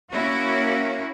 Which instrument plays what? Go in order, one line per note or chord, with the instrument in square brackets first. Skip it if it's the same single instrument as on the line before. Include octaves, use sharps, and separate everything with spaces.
[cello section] A#3 C#4 E4 F#4